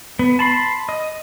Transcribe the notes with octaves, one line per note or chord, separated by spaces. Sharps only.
B3
A5 B5 C6
D#5